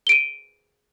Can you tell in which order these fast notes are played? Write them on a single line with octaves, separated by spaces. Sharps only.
G7 D7 D#7